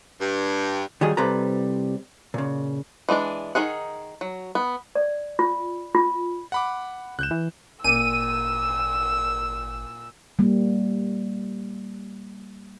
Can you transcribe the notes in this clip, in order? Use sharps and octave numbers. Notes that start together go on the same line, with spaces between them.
G2
D#3 F#3 G3 D#4 G#4
C2 C3 G3 A4 B4 A#5
A#2 C#3
E3 G#3 D4 D5
D#3 F#3 D#4 G#4 F#5
F#3
B3
D5
F4
F4
F#5 B5 D6
C#2 F#6 G6 E7
E3
G#1 A#2 A#3 E6 D#7
G3 A#3